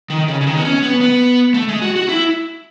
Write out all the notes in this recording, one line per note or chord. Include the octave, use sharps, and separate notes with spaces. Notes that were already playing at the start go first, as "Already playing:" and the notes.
D#3
C#3
C#3
D#3
B3
C#4
B3
B3
A3
G#3
F#4
F#4
E4